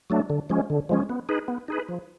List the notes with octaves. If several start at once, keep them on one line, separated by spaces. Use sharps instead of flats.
F#3 A3 D4
D3
F3 G#3 C#4
D3
F3 G#3 C#4
B3
D#4 G#4 B4
B3
D#4 G#4 B4
F3